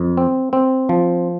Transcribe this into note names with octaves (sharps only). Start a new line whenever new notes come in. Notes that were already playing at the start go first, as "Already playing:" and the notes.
Already playing: F2
C4
C4
F3